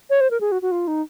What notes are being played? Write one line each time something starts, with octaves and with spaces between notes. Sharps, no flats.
C#5
C5
A#4
G#4
F#4
F#4
F4
D#4